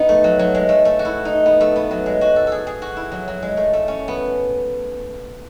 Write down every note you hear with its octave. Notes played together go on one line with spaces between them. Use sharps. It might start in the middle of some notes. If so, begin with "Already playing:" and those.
Already playing: B3 D#4
A3
F#3
F#3
G#3
A3
A3
F#4
E4
D#4
B3
A3
B3
F#3
G#3
F#4
A4
G#4 A4
G#4
F#4
E4
F#3
F#3
G#3
A3
A3
C#4
B3